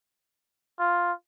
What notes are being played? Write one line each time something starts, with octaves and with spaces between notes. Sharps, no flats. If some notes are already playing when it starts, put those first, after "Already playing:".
F4